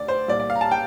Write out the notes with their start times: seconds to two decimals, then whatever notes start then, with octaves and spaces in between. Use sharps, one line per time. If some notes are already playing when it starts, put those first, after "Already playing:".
Already playing: D2 C3 D5
0.08 C5
0.28 C2 A#2 D5
0.40 D5
0.50 F5
0.55 A#5
0.61 A5
0.71 G5